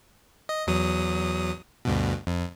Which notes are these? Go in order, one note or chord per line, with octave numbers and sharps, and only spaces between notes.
D#5
E2 F#3 D#6
D2 G2 B2
F2